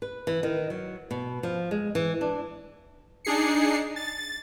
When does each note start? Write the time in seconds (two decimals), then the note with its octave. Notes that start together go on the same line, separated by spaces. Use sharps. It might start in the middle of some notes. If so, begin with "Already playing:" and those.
0.02 B4
0.27 E3
0.43 D#3
0.70 F#3
1.11 B2
1.43 F3
1.71 G#3
1.95 E3
2.21 D4
3.25 D4 D#4 G#4 C7 C#7
3.96 A6